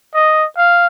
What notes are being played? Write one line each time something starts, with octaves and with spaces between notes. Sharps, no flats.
D#5
F5